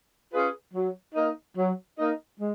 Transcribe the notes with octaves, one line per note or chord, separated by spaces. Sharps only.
C#4 F4 G#4 B4
F#3
A#3 D#4 A#4 D#5
F#3
A#3 D#4 A#4 D#5
G#3